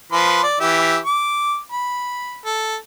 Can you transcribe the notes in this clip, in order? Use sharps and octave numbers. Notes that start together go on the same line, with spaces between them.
F3 B4 C6
D5
E3 G4 E5
D6
B5
A4